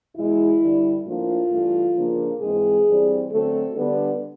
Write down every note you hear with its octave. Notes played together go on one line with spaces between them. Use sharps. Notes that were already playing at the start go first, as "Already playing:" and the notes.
E2 B2 G#3 E4
G2 D3 G3
A2 F3 A#3 D4 F4
G2 E3 A3
C#3 F3 A#3 D4
G#2 E3 G#3 C4 G#4
G2 E3 G3 C4
D3 F#3 A3 C4 A4
D3 G3 B3 D4